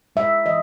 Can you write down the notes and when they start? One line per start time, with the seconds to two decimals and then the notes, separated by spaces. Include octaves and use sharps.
0.16 G#3 E5
0.45 E3 D#5